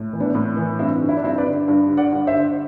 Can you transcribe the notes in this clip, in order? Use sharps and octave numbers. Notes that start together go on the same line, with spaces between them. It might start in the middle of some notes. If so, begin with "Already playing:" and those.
Already playing: A2
E3
B3 D4
A2
E3
G2 C4 E4
D3
E4
D4
G2 C4 E4
B4 D5
D3
G2
D3
D5 F#5
G2
C5 E5
D3